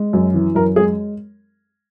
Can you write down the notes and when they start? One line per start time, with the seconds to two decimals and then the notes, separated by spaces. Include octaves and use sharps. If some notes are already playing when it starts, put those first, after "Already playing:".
Already playing: G#3
0.13 F#2
0.34 E3
0.55 F#2 A#4
0.76 G#3 G#4